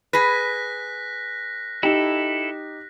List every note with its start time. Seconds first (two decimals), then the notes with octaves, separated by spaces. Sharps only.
0.13 G#4 B4 F#6 A#6 B6
1.83 D#4 E4 G4 A4